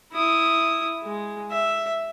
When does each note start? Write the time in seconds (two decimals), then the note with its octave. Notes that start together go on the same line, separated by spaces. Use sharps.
0.12 E4 D#6
1.03 G#3
1.50 E5